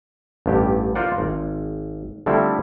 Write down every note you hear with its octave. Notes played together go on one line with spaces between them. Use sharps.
A1 G2 G4
F4 A#4 C5 D5 F#5
G#1
D3 F3 G3 A3 C4 E4